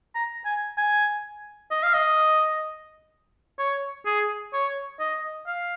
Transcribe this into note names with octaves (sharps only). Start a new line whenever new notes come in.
A#5
G#5
G#5
D#5
F5
D#5
C#5
G#4
C#5
D#5
F5